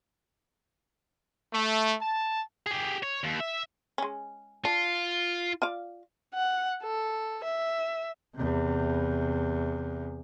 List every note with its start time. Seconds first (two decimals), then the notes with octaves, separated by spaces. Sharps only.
1.54 A3
2.02 A5
2.67 G4 G#4
3.03 C#5
3.24 D#2
3.40 E5
3.98 G#3 C#4
4.65 D4 F4
5.62 F4 D5 F5
6.34 F#5
6.83 A4
7.44 E5
8.35 E2 C3